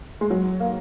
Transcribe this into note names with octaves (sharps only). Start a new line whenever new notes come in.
G#3
F#3
A#3